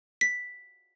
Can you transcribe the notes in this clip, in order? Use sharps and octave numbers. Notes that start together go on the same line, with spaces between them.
B6